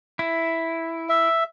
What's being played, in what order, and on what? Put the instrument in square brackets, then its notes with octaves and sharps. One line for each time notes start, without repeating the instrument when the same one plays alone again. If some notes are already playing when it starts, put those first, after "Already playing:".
[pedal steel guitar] E4
[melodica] E5